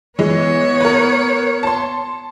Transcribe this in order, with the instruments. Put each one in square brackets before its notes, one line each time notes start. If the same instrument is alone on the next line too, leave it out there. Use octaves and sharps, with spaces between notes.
[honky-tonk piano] E3 G#3 [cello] B3 C#5
[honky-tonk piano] A#4 B4
A5 C6